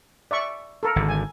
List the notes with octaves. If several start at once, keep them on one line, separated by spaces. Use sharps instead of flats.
D5 E5 C#6
A4 A#4
G#1 D3
G#5